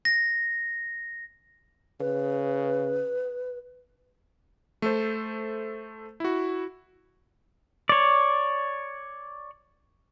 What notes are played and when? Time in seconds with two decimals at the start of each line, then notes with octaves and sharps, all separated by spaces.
0.05 A#6
2.00 C#3 B4
4.82 A3 A4 C5
6.20 E4 F#4
7.89 C#5 D5